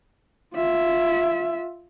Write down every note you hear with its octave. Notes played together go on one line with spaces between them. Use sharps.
F4 E5